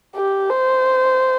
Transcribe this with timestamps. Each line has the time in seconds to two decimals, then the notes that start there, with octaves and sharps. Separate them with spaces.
0.15 G4
0.50 C5